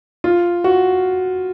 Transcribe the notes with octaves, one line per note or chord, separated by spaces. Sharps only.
F4
F#4